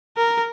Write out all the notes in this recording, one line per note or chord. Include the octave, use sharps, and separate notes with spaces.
A#4